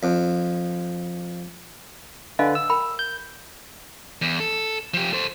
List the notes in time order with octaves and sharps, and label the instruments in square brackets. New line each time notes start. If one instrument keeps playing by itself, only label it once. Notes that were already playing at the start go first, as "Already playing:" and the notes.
[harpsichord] F2
[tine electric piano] D3 B4 [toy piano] D#5 F5 G#5
[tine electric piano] E6
[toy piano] A#4 G5 B5
[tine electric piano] G6
[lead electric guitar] E2
A4
F3 G4
A4 C5